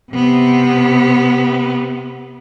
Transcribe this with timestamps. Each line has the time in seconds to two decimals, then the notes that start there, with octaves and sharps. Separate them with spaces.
0.12 C3 B3